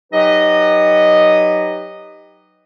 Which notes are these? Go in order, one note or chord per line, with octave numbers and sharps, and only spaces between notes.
F#3 D#4 G4 B4 D#5